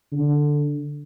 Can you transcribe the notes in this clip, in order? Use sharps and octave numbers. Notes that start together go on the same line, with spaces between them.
D3